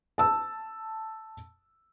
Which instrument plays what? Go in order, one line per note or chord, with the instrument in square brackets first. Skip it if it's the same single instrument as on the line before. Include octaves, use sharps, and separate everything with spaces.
[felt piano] A5 E6